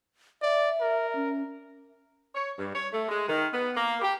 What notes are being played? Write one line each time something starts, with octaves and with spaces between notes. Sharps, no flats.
D5 E5
A#4
C#4
C#5
G2
C#5
A3
G#3
D#3
B3
A#3
G4